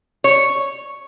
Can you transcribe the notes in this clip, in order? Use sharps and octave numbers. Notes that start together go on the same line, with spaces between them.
C#5